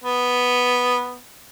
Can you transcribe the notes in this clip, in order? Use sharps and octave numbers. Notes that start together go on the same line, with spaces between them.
B3